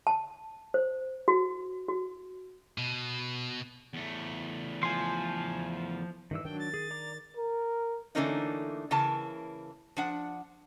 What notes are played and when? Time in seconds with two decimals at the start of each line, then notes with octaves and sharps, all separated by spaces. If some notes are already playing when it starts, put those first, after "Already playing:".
0.07 A5
0.74 C5
1.28 F#4
1.89 F#4
2.78 B2
3.93 E2 A3
4.83 F3 G#5 C6
6.31 G2 D#3 E3 E6
6.45 D#3 F#3 D4 G5
6.59 A6
6.74 G#4
6.91 D5 A#5 D6
7.37 A#4
8.15 D3 E3 A3 A#3 C#4 D#4
8.91 C#3 E3 A#3 A5
9.97 F3 D4 F#5